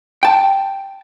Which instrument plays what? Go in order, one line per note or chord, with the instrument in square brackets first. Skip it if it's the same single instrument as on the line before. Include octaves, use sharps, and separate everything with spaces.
[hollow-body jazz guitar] G5 A5